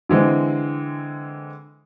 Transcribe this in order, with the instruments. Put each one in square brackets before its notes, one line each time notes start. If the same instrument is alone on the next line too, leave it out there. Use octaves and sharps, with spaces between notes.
[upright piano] D3 E3 G#3 C4